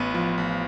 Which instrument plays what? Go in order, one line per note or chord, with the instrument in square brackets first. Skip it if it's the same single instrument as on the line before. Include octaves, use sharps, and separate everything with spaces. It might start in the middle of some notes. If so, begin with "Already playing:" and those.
Already playing: [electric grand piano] A1 [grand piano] B3
[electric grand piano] F3
A1